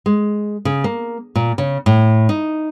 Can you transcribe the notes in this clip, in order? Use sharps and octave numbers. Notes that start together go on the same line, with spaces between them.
G#3
C#3
A#3
A#2
C#3
A2
D#4